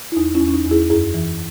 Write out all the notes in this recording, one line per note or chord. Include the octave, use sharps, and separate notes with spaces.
E4
E2 D#4
C#4 E4
E2
C#4
D#4
E2
E4 G#4
F#2 E4 G#4
E3